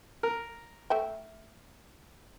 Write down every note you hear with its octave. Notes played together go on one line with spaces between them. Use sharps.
A#4
A3 E5 G5